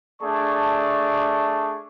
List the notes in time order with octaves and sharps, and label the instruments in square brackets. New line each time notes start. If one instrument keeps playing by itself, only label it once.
[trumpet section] A3 D4 G#4 D5 A5 C#6